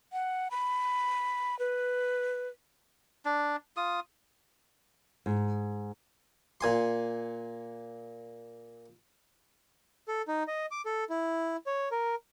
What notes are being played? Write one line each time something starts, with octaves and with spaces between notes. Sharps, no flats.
F#5
B5
B4
D4
F4 D#6
G#2
A#2 G#5 C6
A4
D#4
D#5
D6
A4
E4
C#5
A#4